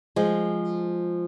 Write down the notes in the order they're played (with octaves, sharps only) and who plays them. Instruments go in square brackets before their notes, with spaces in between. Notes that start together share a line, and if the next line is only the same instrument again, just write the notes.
[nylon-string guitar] F3 G#3